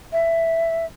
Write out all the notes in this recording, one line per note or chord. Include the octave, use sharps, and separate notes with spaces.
E5